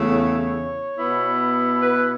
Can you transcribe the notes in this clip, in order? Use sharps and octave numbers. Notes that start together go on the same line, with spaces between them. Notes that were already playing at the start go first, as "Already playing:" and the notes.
Already playing: E2 C#3 A3
C#5
B2 B3 E4
B4